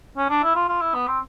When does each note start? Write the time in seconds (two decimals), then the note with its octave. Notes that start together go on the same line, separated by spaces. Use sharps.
0.17 C#4
0.30 D4
0.43 E4
0.56 F4
0.69 F4
0.81 E4
0.94 B3
1.07 C4